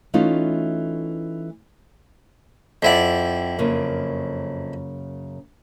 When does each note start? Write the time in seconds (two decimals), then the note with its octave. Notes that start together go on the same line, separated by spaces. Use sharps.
0.14 E3 A3 C#4 D#4 F4
2.83 F2 C4 E4 D5 F#5
3.59 F#2 C#3 A#3